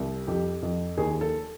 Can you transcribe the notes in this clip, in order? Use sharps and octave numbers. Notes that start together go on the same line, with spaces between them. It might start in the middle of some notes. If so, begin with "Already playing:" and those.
Already playing: C2
F2 G4
F2
D#2 G#4
A4